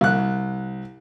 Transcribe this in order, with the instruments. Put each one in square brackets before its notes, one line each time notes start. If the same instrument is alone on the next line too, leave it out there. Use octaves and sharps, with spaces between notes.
[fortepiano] C2 F#6